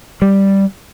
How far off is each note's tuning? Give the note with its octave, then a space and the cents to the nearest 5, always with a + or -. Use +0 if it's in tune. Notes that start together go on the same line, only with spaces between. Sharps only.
G3 +0